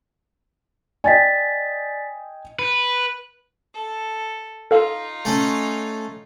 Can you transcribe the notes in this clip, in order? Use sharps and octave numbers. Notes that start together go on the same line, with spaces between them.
D5 D#5 G5 G#5 A6 B6
B4
A4
D#4 F4 A4 F5
A3 C#4